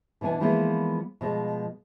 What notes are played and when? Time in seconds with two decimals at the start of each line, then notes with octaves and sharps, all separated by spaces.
0.21 B2 E3 B3 D4 G#5
0.40 E3 F3 G#3 A#3 B3 F4
1.21 B2 F3 G#3